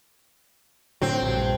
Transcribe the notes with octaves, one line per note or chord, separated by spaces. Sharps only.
A2 D3 F#3 C4
A#1 G2